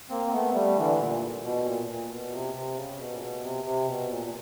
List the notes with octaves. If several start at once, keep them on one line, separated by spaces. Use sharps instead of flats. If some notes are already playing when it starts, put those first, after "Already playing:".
A#3 C4
C4
A3 B3
G3 A3
D3 E3
A#2
B2
A#2
A#2
B2
C3
C3
C#3
B2
A#2
B2
C3
C3
B2
A#2
A#2